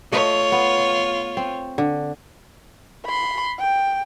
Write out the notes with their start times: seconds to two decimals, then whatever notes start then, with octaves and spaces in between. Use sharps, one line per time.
0.12 A3 F4 C#5 D#5 E5
0.52 B3
1.37 C4
1.78 D3
3.06 B5 C6
3.59 G5